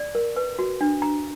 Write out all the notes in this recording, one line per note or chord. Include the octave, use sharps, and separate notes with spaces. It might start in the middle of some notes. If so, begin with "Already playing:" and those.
Already playing: D5
A#4
B4
F#4
D4
A#5